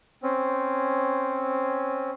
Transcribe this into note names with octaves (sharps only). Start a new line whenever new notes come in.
C4 C#4